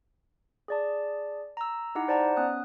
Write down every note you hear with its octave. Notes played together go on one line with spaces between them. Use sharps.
G#4 D5 A5
A#5 E6
D#4 E4 G4 F#5 A#5
C5 D5 F#5 A5 A#5
B3 C#4 D#6 F#6